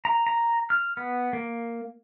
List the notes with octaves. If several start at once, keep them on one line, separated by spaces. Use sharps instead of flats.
A#5
A#5
F6
B3
A#3